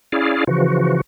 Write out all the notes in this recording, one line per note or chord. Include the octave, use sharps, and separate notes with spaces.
C#4 E4 G#4 D5 F5
C#3 E3 F3 F#4